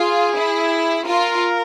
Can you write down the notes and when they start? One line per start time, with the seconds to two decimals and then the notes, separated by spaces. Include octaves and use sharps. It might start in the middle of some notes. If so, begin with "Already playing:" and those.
Already playing: F4 G#4
0.36 E4
1.08 F4 A#4